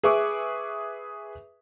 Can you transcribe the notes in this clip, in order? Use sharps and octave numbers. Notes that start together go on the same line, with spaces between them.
G#4 B4 E5 C#6 D6